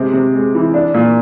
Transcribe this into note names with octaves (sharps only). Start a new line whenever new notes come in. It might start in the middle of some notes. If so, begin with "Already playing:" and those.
Already playing: C3 G#3
C3
G#3
E3
D4
A#2